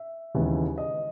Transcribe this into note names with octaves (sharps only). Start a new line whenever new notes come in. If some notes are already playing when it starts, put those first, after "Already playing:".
Already playing: E5
D#2 C#3 E3 G#3 B3
D#5